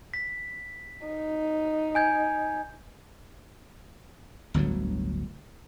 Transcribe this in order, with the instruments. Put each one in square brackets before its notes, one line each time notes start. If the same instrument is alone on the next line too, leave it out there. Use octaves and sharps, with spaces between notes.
[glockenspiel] B6
[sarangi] D#4
[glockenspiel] G#5 G6 G#6
[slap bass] G1 D2 A2 F#3